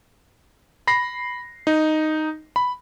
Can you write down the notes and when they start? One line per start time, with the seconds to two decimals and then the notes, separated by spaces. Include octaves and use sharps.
0.87 B5 A#6 C7
1.67 D#4
2.56 B5